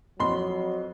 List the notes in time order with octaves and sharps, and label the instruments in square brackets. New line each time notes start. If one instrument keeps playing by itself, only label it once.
[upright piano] F2 F#4 [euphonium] F#3 [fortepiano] B5 C6